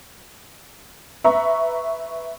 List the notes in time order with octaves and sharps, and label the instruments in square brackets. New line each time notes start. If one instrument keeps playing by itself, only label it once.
[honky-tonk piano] B4 E5 A#5 C#6